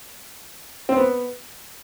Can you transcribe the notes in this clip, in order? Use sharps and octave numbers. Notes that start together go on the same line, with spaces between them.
C4
B3